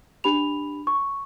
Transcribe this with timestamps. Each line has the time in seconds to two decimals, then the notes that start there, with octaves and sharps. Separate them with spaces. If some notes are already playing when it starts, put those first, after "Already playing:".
0.24 D4 G4 B5 F7
0.87 C#6